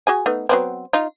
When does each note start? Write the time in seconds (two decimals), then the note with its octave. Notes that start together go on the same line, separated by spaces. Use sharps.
0.07 F#4 G#4 G#5
0.26 A3 B3 D#4
0.49 F#3 B3 C4
0.93 D#4 F4